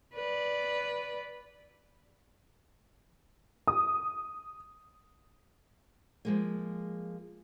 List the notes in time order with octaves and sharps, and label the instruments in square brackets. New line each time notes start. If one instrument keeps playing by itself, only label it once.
[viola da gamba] B4 D5
[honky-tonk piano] D#6
[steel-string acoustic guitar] F3 G#3 A#3